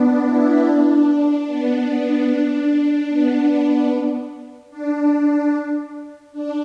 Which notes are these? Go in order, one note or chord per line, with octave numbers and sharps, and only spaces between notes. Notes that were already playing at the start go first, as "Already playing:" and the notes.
Already playing: B3 D4
B3 E4
D4
B3
D4
B3
D4
D4